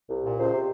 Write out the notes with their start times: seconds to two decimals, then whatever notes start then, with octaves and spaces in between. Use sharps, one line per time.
0.08 C2
0.23 A#2
0.38 C#2 C5
0.52 C3